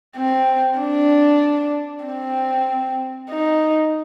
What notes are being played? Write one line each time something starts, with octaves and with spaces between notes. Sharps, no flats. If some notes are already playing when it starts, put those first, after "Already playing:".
C4
D4
C4
D#4